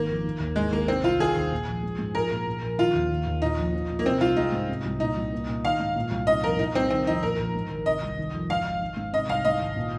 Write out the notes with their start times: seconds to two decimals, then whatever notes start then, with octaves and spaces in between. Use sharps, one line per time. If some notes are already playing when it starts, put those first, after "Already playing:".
Already playing: G#1 D#3 A#3
0.09 F2
0.24 D#3
0.40 D#2
0.56 G#2 G#3
0.72 G#1 A#3
0.88 C3 C4
1.03 C2 F4
1.19 D#3 G#4
1.36 D#2
1.52 A#2
1.68 A#1
1.83 G#3
1.98 G#2
2.14 F3 A#4
2.31 A#2
2.47 A#2
2.62 A#1
2.78 D#3 F4
2.95 D#2
3.10 D#3
3.26 D#2
3.42 A#2 D#4
3.58 A#1
3.73 F3
3.90 A#2
3.99 A#3
4.06 C3 C4
4.21 C2 F4
4.36 G#3 D#4
4.52 G#2
4.69 C3
4.85 C2
5.00 A#2 D#4
5.17 C2
5.32 A#3
5.49 A#2
5.65 D#3 F5
5.80 G#2
5.96 A#2
6.11 C2
6.27 C3 D#5
6.43 F2 A#4
6.59 A#2 D#4
6.75 C2 C4
6.90 D#3 C4
7.07 F2 D#4
7.22 A#2 A#4
7.39 A#1
7.55 G#2
7.70 G#1
7.86 C3 D#5
8.02 C2
8.18 D#3
8.33 F2
8.49 G#2 F5
8.65 G#1
8.81 D#3
8.97 G#2
9.13 C3 D#5
9.28 C2 F5
9.45 G#2 D#5
9.61 G#1
9.76 A#2